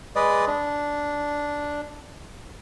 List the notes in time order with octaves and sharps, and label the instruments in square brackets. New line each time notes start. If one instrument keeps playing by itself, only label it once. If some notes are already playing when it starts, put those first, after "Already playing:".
[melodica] G#3 B4 D5 D#5
D4